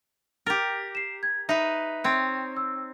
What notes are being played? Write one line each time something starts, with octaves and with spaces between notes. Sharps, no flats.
G4 A#4 A6
C7 E7
G#6
D#4 B4 E5
C4 C#5
E6